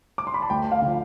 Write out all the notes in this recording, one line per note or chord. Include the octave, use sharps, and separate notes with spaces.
D6
C6
B5
A5
D2 G5
F5
D3 F3